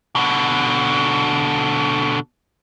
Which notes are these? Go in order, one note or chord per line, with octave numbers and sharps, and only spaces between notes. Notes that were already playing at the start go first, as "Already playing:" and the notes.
B2 D3